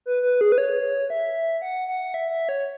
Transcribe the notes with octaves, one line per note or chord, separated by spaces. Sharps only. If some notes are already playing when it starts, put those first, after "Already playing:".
B4
B4
G#4
B4
C#5
E5
F#5
F#5
E5
E5
C#5